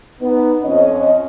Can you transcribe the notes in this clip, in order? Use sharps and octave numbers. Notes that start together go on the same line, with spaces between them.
B3 D#4
F2 C#4 D#5